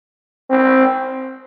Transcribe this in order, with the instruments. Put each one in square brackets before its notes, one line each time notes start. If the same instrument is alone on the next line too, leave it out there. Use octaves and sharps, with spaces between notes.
[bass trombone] C4